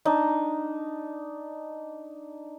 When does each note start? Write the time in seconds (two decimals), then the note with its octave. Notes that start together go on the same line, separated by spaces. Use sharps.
0.05 D4 D#4